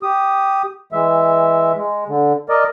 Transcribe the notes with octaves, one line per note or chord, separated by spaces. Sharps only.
G4 D#6
E3 G#3 E5
G#3
D3
A#4 D5 D#5